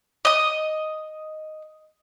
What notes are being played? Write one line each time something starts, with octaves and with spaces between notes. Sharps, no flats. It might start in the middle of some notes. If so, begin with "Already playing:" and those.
D#5 D#6